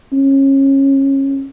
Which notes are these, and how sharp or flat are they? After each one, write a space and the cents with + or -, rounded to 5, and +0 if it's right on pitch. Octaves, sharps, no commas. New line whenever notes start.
C#4 -25